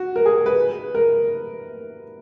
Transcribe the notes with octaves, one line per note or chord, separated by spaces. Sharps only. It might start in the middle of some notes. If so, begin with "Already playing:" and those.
Already playing: F#4
A#4
G#4
B4
A#4